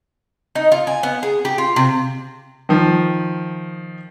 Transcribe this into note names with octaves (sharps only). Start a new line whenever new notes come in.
D#4
F4
G#5
B3
G#4
G4
F4
C3
D#3 F3